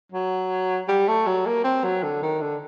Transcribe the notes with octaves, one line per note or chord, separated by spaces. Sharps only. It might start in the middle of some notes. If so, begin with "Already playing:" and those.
F#3
G3
A3
F#3
A#3
C4
F#3
D3
D#3
D3